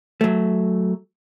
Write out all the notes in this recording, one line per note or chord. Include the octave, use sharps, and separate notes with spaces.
F#3 A3